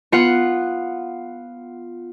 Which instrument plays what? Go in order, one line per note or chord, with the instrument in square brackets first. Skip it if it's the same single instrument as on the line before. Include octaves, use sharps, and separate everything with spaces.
[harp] B3 F4 F#5